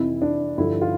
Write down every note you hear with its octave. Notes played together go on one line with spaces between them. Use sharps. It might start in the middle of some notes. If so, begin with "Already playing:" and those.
Already playing: F2 C3 E3 E4
D4
G2 D3 F3 E4
F4